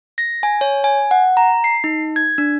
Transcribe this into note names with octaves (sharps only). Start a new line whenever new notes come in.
A#6
G#5
C#5
G#5
F#5
A#5
C7
D#4
G#6
D4